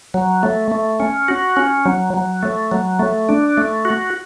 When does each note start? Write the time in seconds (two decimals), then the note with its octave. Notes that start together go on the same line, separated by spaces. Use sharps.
0.14 F#3
0.43 A3
0.71 A3
1.00 C#4
1.28 F#4
1.57 C#4
1.86 F#3
2.14 F#3
2.43 A3
2.72 F#3
2.99 A3
3.29 D4
3.57 A3
3.85 F#4